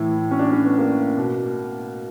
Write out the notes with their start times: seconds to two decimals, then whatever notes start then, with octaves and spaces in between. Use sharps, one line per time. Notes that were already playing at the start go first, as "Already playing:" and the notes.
Already playing: A2 E3 E4
0.31 C#4
0.39 D4
0.52 C#4
0.65 B3
0.78 A#3
1.17 B2